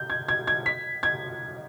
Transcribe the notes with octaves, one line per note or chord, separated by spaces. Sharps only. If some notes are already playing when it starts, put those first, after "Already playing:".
Already playing: G6
G#6
G#6
G#6
B6
G#6